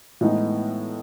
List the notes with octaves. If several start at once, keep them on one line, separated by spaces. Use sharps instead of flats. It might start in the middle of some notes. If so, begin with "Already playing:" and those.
A2 E3 G#3 B3 D#4